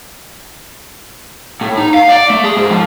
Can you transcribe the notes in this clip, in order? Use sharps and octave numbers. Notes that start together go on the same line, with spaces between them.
A2
D#4
F5
D5
A3
G#4
G#2
F3